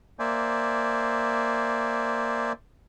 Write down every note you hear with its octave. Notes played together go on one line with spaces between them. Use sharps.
A#3 C5 D5 E5 G#5